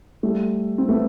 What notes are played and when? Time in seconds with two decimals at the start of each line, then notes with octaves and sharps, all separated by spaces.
0.23 G3 A3
0.78 C4
0.89 A3 B3